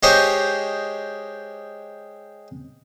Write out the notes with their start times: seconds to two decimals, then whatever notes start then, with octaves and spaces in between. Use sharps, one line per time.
0.03 G#3 G4 C5 C#5 D#5